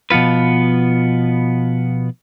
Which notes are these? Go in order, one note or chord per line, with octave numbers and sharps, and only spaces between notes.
B2 F3 B3 F4 B4